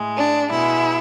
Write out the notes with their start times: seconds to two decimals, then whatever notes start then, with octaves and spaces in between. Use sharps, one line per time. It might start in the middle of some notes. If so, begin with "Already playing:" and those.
Already playing: A2 G#3
0.18 D4
0.50 B2 G#3 E4